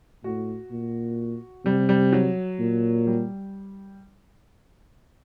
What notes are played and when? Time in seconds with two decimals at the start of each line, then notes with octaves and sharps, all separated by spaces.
0.24 A2 F#4
0.71 A#2
1.65 C3 G3
1.89 G3
2.13 F#3
2.60 A#2
3.07 G3